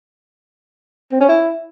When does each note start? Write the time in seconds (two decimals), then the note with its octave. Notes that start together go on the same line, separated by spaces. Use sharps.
1.12 C4
1.20 C#4
1.29 E4